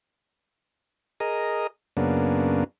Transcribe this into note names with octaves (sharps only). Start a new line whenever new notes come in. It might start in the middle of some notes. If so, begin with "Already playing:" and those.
G#4 A#4 D#5
F#2 C#3 A#3 B3 D4